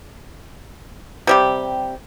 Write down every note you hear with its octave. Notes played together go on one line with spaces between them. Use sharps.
C3 G3 G4